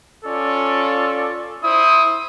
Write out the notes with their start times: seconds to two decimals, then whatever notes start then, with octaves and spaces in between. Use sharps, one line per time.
0.25 C#4 F4 A4 D5
1.64 E4 C5 D#6